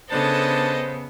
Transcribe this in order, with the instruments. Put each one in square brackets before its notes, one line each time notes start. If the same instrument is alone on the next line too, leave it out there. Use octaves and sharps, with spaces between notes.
[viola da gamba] C#3 B3 [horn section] D4 A5 [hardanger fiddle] A4 D#5 [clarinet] C5